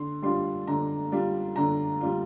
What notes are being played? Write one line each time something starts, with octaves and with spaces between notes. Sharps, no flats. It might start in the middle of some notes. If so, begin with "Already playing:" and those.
Already playing: D3 C6
G3 D4 F4 C6
D3 A#5
G3 D4 F4
D3 A#5
G3 D4 F4